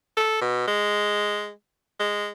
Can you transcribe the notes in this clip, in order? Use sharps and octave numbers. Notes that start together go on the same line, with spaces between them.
A4
B2
G#3
G#3